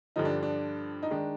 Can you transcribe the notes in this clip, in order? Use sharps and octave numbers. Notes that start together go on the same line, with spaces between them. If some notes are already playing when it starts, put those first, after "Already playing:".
G2 D3 F3 D#4
D4
D4
D#4
D#3 G#3 D4